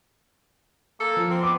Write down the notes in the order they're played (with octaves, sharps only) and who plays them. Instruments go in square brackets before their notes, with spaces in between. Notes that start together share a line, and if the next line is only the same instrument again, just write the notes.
[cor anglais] A#3 [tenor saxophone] A4
[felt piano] F3
[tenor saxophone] C4
[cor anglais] B3 [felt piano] D6